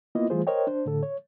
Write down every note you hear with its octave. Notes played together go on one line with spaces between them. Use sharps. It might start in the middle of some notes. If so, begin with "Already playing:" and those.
A#3 B3 E4 F4 D#5
E3 G3 A3 F4 G#4 C5
A#4 C5 C#5 D#5 G5
D4 C5
A2 D3 A4
C#5